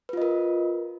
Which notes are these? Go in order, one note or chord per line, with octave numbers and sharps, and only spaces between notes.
F4 A#4 B4 D#5